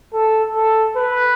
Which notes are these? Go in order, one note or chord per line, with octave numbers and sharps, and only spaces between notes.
A4
A4
B4